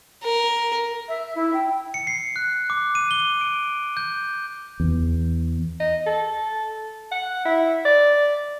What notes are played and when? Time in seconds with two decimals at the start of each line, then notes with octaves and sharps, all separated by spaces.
0.23 A#4
1.08 E5
1.35 E4
1.54 G5
1.94 C#7
2.07 C7
2.36 F#6
2.70 D6
2.95 D#7
3.11 G7
3.41 D7
3.97 G6
4.80 E2
5.80 D#5
6.07 A4
7.12 F#5
7.46 E4
7.85 D5